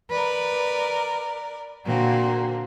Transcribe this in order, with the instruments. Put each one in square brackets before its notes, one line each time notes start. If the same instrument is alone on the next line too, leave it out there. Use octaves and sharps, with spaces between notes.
[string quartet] A#4 D5 [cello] B4
[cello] A#2 F#4 [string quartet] D3 A#3 C4